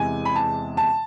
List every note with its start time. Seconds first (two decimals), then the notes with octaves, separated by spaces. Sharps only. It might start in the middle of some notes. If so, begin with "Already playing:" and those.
Already playing: E2 C3 E3 G#3 G#5
0.25 B5
0.35 A5
0.77 A5